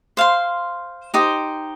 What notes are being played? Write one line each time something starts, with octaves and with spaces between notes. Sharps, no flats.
C5 F5 C6
D#4 G4 C5 G5